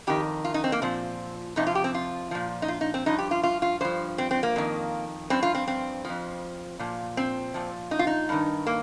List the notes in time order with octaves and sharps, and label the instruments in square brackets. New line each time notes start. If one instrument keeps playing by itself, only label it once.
[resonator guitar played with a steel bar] F2 D#3 G4
F4
D#4
C4
A#3
A#2 F3 C4
F2 C3 F3 D#4
F4
G4
C4
F4
A#2 F3
D#4
F4
D#4
C4
G2 F3 D#4
G4
F4
F4
F4
G2 F3 C5
C4
C4
A#3
F2 D#3
G2 F3 C4
F4
C4
C4
F2 F3
A#2 F3
C4
A#2 F3
D#4
F4
D#4
G2 D#3
A#3